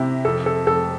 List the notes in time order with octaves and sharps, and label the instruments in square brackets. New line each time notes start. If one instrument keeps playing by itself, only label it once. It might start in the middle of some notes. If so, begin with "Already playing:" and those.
Already playing: [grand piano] C3 E4 G4
F2 A4
A4
F2 A4